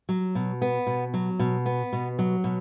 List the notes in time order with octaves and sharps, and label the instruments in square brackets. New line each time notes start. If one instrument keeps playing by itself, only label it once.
[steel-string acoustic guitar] F#3
B2
B3
B2
F#3
B2
B3
B2
F#3
B2